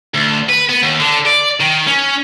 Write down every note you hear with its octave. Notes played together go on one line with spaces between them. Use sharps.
D2
B4
B3
D#2
D3
D5
D#3
C#4